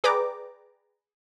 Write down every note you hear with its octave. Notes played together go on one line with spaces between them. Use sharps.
G#4 B4 D5 G5 A#5 D6